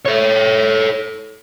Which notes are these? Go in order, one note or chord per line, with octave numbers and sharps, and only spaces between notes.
A4 C#5